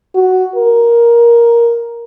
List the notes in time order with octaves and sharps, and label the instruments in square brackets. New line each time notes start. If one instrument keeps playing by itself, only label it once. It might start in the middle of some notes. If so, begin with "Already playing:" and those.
[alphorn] F#4
A#4